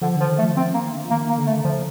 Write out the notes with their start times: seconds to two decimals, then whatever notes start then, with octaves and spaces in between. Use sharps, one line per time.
0.02 D3 F3
0.16 D3 F3
0.28 D#3
0.38 A3
0.42 F3
0.56 F3 C4
0.74 D#3 A#3
0.92 D3
1.05 F3
1.10 D#3 A#3
1.29 A#3
1.37 D3
1.47 A3
1.64 D3 F3